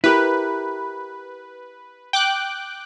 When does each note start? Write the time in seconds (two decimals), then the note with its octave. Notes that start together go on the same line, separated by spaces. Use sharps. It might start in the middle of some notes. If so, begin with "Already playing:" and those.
0.04 E4 G4 A#4 B4
2.13 G5 D6 F#6